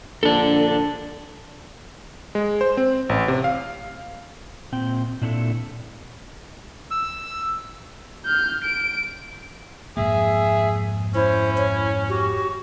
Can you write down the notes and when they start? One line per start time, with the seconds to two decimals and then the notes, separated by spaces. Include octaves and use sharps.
0.23 A#1 D4 A4
2.35 G#3
2.61 C5
2.77 C4
3.09 A1
3.28 C3
3.44 F5
4.72 A#2 C4 G5
5.21 A#2 C4 D4 E4 F#4 A4
6.91 E6
8.25 F6 G6
8.65 D7
9.97 F2 G#2 A#3 G#4 E5
11.15 C#4 E4 C5
11.58 C#5
12.09 F#4 G4